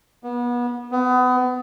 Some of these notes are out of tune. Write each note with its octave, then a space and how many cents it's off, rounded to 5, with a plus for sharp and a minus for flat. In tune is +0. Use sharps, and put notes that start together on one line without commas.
B3 -30
B3 +30